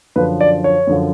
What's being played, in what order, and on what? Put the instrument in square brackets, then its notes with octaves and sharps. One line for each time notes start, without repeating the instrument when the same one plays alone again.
[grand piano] F#2 D3 F3 B4
D5
C#5
F#2 D3 F3